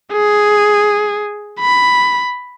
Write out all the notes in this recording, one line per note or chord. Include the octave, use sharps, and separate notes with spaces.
G#4
B5